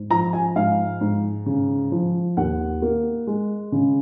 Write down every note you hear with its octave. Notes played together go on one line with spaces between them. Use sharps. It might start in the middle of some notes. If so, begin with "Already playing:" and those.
Already playing: G#2
F3 A#5
G#5
G#2 F5
G#2
C#3
F3
D#2 F#5
A#3
G#3
C#3